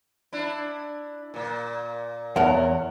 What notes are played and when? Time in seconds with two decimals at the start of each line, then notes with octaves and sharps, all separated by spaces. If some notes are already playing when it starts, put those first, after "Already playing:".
0.33 D4 E4
1.34 A#2 A#3
2.36 E2 A#4 C#5 E5 F#5 A5